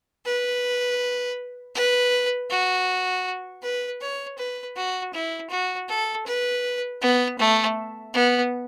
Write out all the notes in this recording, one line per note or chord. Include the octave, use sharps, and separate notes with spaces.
B4
B4
F#4
B4
C#5
B4
F#4
E4
F#4
A4
B4
B3
A3
B3